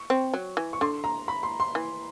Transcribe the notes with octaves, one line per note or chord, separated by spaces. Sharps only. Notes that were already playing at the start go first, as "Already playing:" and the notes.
Already playing: C#6
C4
F#3
E3
C#6
D3 C6
A#5
B5
C6
C6
E3